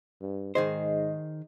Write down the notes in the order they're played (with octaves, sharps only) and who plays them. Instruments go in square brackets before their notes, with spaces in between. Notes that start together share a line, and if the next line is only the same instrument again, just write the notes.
[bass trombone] G2
[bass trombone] G#2 [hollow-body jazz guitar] D#3 G#4 C5 [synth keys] D#5